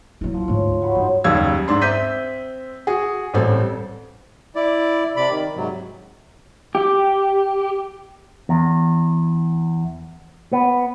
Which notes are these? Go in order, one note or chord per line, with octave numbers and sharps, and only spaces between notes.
F#3 E4
F3
D2 G#2 C#5
F#3 C#5 B5
G2 D#4 C5 G#5
F#1 D#2 G3 E6 G#6
G#2 D4 C6
C4 E5 G6 B6 D#7
F#4 G#4
A1 G3 C4 A4
E4 D5
C3 D5 B5
D#3
G#2 C3 F#3
G4
E2
B3